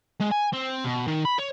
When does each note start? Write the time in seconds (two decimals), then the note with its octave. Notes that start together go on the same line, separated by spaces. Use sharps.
0.20 G#3
0.31 G#5
0.53 C4
0.85 B2
1.07 D#3
1.25 B5
1.38 C#5